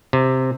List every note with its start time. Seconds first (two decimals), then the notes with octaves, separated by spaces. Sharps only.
0.13 C3